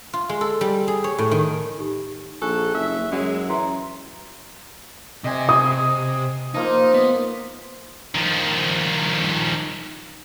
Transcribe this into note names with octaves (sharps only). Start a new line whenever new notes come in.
F4
G#3
A4
G3
G#4
C#5
A2
D#3
D#4 G4
A#1 A4 G#5 C#6 F#6
F#1 E5
F#2 G#3
E3 E5 A#5 C6
C3 D#5 G#5
D#6
F3 A#3 D#4 F4
B3
D#3 F3